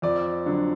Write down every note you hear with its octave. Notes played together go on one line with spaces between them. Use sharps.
F2 D5
D3 F#3